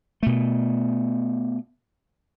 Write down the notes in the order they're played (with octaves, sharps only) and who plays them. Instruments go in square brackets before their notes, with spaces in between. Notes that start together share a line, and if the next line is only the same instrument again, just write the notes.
[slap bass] B2 A3